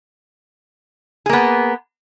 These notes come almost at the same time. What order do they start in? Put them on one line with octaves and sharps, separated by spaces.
G#4 A#3 B3